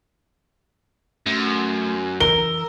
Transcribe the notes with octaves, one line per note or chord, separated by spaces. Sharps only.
F#2 A3 C6
E3 A#4 E6 G7